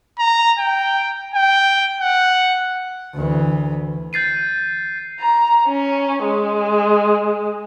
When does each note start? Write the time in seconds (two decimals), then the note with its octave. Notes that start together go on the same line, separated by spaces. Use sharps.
0.19 A#5
0.59 G5
1.35 G5
2.01 F#5
3.14 D2 E3
4.13 G6 A6 C7 D#7
5.20 A#5
5.68 C#4
6.24 G#3